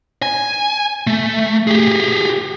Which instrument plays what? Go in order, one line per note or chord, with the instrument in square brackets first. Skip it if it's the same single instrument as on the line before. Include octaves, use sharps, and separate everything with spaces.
[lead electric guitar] G#5
A3
G4 G#4